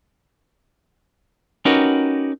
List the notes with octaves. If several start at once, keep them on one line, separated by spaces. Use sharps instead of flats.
C#4 D#4 F#4 G4 A#4 B4